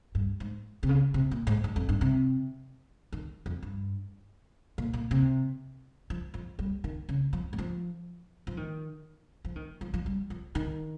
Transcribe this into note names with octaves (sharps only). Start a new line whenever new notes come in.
G2
G#2
C3
C#3
C3
A#2
G#2
G2
F2
G2
C3
D#3
F2
G2
A#2
A#2
C3
F3
F3
G3
D#3
C#3
F3
G3
F3
F3
D#3
F3
D#3
F3
F3
G3
F3
D#3